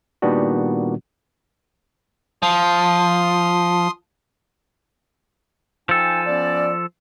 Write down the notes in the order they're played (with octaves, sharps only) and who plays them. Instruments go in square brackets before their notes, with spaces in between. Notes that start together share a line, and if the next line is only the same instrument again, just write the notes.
[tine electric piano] A#2 D#3 G3 B3 D4 F#4
[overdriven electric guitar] F3 [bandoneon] C6 D#6
[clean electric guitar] F3 A4 [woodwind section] D#4 G5 G#5
[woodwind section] B3 C#4 D5